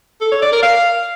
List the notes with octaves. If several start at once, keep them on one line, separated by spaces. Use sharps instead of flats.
A4
C#5
D5
A#4
F5